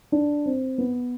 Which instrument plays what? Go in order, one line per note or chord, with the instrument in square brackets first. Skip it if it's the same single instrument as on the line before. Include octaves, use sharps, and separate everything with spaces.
[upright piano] D4
C4
B3